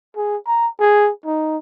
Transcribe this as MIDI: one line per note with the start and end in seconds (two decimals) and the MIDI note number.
0.16 0.36 68
0.47 0.68 82
0.80 1.11 68
1.26 1.57 63